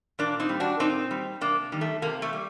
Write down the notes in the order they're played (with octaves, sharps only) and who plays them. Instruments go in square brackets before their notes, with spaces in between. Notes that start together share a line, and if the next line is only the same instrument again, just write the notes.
[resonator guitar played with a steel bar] A#2 A#3 D4
C4 D#4
G3
D4 F#4
A#2 C4 D#4
G3
C3 A#3 D4
D#3 G3
A3
C3 A#3
A3
G3